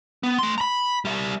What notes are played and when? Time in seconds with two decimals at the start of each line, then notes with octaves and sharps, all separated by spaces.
0.23 B3
0.39 A3 C6
0.58 A#5 B5
1.05 G3 E5